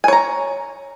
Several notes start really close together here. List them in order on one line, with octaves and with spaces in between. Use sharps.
G#5 C#5 A#5